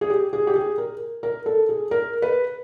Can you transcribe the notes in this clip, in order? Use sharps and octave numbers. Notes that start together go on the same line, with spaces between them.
G#4
G4
G#4
G4
G#4
A#4
A#4
A4
G#4
A#4
B4